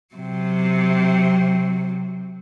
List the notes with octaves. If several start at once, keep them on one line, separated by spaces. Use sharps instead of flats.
C3 F#3